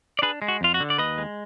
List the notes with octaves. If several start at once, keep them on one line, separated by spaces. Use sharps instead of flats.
D5
D4 G#4 B4
G#3
F#4
F2 F4
F#4
D3
D5
D#2 B4 D#5
G#3